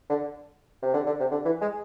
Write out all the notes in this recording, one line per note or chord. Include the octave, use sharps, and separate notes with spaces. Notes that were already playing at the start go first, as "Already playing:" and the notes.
D3
C3
D3
D3
C3
D3
E3
G#3